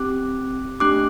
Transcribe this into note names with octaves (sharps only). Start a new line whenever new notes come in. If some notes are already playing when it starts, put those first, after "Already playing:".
Already playing: C4 G4 D6 F#6
A3 D4 G4 D6 F#6